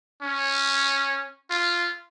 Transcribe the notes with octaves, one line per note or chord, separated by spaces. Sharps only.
C#4
F4